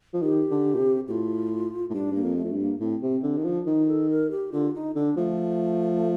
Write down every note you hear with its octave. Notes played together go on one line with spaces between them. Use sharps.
F3
D#3 G4
D3
A#2
C3
A2 F4 G4
A2
G2 D4
G2 A#3
F2
A3
F2
G2
A#3
A2 C4
C3
C4
D3
D#3 D4
F3
D#3 D#4
A4
A#4
G4
D3 F4
D#4
D3 D4
F3 A3